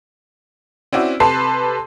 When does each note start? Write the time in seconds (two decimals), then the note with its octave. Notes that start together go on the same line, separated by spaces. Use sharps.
0.93 C4 C#4 E4 F#4 D5
1.20 C3 A4 B4 A5 C6 C7